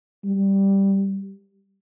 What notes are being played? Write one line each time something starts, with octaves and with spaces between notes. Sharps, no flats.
G3